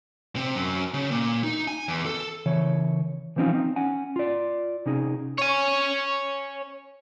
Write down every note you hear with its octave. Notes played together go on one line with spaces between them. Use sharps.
C3
F#2
C#3
A#2
D#4
G#5
E2
A4
C#3 E3 C#5
E3 F3 C4 C#4 D#4 F4
C4 D#4
C#4 F#5 G#5
F4 D5
C3 C#4 D#4 G#4
C#5 G#5